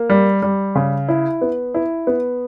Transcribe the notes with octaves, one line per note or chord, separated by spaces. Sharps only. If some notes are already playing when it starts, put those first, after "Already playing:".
Already playing: A#3
G3
G3
C#3
E4
B3
E4
B3